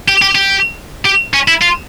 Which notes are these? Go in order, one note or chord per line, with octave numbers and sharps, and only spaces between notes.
G4
G4
G4
G4
C#4
E4
F4